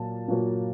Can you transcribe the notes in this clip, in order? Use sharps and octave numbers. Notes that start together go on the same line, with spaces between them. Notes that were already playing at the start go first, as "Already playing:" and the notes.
Already playing: A#2 F#3 A#3 A5
A#2 F#3 A#3